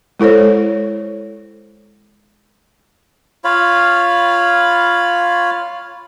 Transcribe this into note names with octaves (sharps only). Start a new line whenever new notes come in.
G#3 E4 A4 C5 C#5
F4 C#5 F5 B5